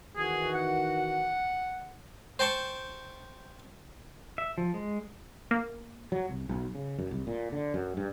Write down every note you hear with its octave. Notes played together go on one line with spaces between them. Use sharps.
D#3 E3 F#4 G#4
F#5
C5 G5 A5 C#6
E5
F3
G#3
A#3
F#3
C2
B1
C#3
F#2
C2
A#2
D3
F#2
G2